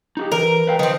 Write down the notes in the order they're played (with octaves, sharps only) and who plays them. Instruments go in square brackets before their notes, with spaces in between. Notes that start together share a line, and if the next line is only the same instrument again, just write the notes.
[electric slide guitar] D#4 F#4 G4
[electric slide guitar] E3 [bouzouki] A#4
[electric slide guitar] B4 F5 G5
[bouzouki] D#3 C4 [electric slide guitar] F3 C5